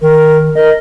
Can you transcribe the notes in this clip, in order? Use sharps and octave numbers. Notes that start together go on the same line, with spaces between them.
D#3 A#4
A#4 D#5